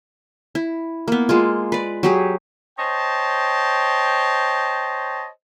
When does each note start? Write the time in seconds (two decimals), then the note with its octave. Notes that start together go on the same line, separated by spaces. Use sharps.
0.55 E4
1.08 A#3 B3
1.29 G#3 A#3 F4
1.72 B4 D5
2.03 F#3 G4 G#4
2.78 C5 C#5 D#5 G5 A5